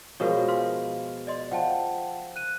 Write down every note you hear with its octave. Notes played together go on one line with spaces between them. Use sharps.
B2 F3 G#3 F#4 A#4 C#5
F5 C6 F6
D5 D#5 C6
F3 F#5 G5 A5
F#6 D#7